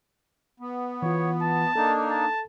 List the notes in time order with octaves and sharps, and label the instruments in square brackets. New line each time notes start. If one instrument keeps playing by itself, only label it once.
[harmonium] B3
[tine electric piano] E3 F4 [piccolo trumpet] C#5
[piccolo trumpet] A5
[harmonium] A#3 D4 D#4 [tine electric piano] A4
[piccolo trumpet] A5